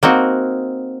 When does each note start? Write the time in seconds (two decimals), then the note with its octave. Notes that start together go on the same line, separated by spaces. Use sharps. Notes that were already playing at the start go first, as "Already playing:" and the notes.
0.03 A#3 C4 D#4 F#4